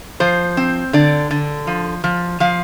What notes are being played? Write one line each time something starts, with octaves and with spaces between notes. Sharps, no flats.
F3 C5
C4
D3 D5
D3
F3
F3
F3 F5